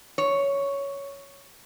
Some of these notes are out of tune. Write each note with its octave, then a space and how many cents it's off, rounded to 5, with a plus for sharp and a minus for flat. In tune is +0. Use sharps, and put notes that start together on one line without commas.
C#5 +5